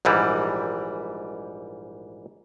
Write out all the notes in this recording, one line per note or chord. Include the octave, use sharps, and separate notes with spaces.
A#1 G#2 E3 G3